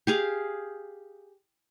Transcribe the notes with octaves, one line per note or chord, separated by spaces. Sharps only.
G4 G#4 F5